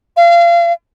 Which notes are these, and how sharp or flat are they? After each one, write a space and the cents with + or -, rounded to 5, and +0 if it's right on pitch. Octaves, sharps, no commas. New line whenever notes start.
F5 -30